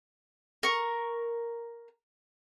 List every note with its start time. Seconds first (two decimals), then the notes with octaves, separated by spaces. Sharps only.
0.63 A#4 C#6